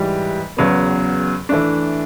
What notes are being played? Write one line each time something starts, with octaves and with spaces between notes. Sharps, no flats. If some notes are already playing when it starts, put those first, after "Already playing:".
Already playing: G#2 E3 G3
E2 C#3 F#3 B3
E3 A3 D4